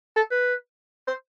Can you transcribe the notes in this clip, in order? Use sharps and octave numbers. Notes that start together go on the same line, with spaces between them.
A4
B4
C5